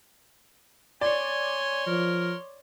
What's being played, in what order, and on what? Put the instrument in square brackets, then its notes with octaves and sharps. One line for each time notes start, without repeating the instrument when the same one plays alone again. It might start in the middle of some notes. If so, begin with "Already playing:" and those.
[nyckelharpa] C#5 C6 [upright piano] D5 [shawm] G#5
[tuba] F3 [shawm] A#4